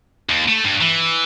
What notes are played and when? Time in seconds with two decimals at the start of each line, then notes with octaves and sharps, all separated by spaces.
0.29 D#2
0.48 A3
0.64 G2
0.81 E3